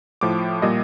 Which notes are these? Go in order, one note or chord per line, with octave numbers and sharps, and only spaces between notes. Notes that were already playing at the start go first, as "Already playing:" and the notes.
A2 F3 D6
A#2 G3 D#5